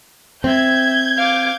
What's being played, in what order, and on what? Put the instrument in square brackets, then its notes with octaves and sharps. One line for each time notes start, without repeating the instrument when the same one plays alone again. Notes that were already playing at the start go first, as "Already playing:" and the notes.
[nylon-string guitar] C4 [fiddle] E5 [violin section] G6 G#6
[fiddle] F5 D6